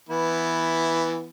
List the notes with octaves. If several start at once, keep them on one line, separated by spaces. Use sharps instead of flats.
E3 B3 E4